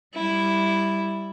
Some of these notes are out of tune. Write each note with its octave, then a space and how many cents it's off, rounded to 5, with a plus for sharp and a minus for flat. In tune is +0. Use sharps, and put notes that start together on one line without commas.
G3 +0 E4 +0